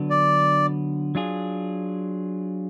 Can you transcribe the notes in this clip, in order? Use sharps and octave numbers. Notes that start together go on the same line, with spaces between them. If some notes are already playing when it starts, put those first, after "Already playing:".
Already playing: D3 F#3 B3 D4
D5
F#3 D4 F4 G#4